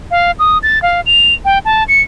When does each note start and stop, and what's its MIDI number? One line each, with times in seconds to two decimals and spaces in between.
0.11 0.31 77
0.39 0.58 87
0.63 0.82 93
0.82 1.01 77
1.06 1.34 101
1.45 1.58 79
1.65 1.84 81
1.88 2.01 97